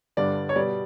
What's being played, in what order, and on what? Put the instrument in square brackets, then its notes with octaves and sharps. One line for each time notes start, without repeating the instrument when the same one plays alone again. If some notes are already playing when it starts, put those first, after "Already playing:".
[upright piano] G2 D3 G3 D5
C#5
B2 G3 D5